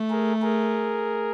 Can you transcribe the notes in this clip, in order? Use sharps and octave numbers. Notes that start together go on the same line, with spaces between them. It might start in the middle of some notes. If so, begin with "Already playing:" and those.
Already playing: A3
G#4 A#4
G#4 A#4